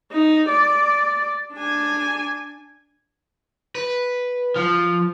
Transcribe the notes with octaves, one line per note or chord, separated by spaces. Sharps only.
D#4
D5
D4 G#5
B4
F3